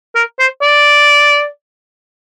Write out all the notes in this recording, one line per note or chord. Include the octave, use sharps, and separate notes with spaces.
A#4
C5
D5